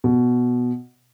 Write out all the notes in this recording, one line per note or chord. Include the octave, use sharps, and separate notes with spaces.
B2